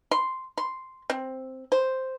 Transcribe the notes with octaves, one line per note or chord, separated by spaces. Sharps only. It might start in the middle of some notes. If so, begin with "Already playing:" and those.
C6
C6
C4
C5